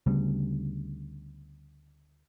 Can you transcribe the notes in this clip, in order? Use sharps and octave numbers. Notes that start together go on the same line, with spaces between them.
D2 C#3 G3 B3